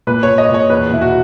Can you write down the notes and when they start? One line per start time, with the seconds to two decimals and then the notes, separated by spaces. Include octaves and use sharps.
0.07 A#2 B4
0.23 C#5
0.28 A#2
0.38 D#5
0.49 A#2
0.54 C#5
0.70 E2 B4
0.91 B2 E4
1.01 F#4